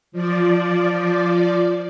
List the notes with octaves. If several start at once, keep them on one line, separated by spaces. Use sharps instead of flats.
F3 D5